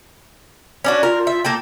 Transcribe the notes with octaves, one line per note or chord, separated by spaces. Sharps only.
C#4 D4 F#4
F4 A#4
E5
A#3 A4 G5